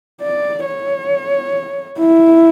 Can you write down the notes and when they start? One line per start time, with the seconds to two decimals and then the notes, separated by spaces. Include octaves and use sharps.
0.21 D5
0.66 C#5
1.99 E4